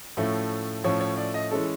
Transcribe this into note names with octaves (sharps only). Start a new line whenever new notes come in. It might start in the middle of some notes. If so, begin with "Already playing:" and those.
A2 F3 A3 C#4
A2 F3 A3 C#4 C#5
C#5
D5
D#5
E3 G#3 C#4 A4